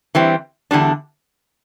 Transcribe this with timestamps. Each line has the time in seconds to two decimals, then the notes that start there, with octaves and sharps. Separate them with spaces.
0.15 E3 G3 C4
0.71 E2 D3 G3 D4